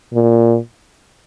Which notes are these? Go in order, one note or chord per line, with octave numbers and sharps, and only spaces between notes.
A#2